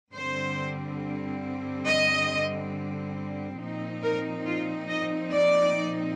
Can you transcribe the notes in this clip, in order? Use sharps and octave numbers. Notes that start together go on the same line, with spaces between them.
G2 D3 G3 C4 C5
D#5
A#2 F3 C4 D#4
A#4
F4
D#5
D5